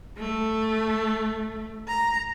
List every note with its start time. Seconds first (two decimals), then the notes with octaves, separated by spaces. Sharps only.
0.18 A3
1.88 A#5